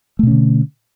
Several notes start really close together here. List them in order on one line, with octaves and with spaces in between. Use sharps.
A3 B2 C#4 D3